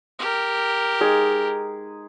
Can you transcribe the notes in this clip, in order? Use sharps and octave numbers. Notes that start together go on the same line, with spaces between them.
G4 A#4
G#3 D#4 G#4